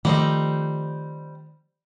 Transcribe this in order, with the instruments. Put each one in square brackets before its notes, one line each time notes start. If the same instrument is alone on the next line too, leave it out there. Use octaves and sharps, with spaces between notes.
[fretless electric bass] D#3 F3 A3 [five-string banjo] G3 C4 D#4